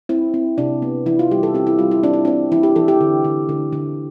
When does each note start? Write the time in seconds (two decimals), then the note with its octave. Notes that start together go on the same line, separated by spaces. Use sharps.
0.09 C4 E4
0.34 C4
0.58 C3 D4
0.82 B3
1.06 E3 E4
1.19 F4
1.31 G3 G4
1.43 A4
1.54 C4 G4
1.67 E4
1.79 G3 F4
1.91 E4
2.03 C4 D4
2.14 E4
2.25 C4 D4
2.52 E3 E4
2.63 G4
2.76 E3 A4
2.88 G4
3.01 D3
3.24 D3
3.49 D3
3.73 D3